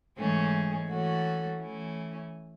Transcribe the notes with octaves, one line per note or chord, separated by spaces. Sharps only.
G#2 E3 A3 C#4 G#4
E3 A3 C#4 F#4 A4
E3 A3 C#4 E4